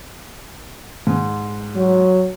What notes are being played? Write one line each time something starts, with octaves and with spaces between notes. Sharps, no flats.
G#2
F#3